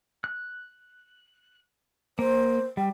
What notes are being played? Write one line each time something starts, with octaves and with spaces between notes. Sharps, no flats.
F#6
A#3 C5
G3 G5